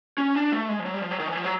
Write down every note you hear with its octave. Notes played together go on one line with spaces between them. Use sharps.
C#4
D4
A3
G#3
F3
F#3
G3
F3
F#3
D#3
E3
F3
F#3